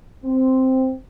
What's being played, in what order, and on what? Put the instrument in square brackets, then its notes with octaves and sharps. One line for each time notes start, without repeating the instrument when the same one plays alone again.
[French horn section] C4